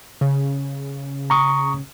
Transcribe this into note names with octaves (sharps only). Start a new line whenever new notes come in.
C#3
A#5 C#6 D#6